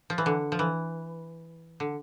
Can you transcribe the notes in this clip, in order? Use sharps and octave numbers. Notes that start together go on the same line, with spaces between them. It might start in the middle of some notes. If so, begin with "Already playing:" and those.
F3
E3
D3
F3
E3
D3